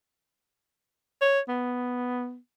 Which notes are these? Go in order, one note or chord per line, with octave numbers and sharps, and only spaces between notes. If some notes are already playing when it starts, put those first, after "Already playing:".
C#5
B3